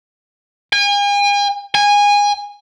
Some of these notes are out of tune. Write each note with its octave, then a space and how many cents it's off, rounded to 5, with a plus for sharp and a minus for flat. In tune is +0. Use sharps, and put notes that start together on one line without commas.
G#5 -40
G#5 -20